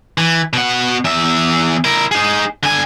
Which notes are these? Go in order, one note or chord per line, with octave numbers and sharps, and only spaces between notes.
E3
B2 F#5
E2 E5
E4 A#4
D#4 G#4
D3 G#5